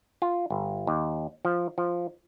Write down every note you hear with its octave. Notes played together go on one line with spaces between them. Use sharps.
F4
G1
D#2
F3
F3